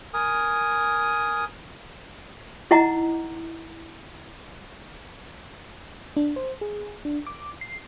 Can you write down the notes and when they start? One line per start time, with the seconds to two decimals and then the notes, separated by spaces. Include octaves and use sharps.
0.14 A#4 G#5 D#6
2.71 D#4 E4 D#5 F#5 A#5
6.17 D4
6.36 C5
6.61 G#4
7.05 D4
7.27 D6
7.61 C7